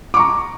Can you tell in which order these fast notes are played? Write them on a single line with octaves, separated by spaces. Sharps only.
D6 C#6 A#5